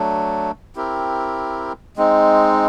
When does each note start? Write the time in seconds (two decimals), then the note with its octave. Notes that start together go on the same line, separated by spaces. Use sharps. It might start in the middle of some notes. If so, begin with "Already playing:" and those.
Already playing: F#3 A3 D4
0.76 C4 E4 G4 A#4
1.97 G#3 C4 D#4